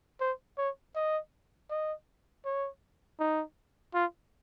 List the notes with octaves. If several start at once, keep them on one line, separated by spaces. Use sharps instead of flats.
C5
C#5
D#5
D#5
C#5
D#4
F4